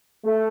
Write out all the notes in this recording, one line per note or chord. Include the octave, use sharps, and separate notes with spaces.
A3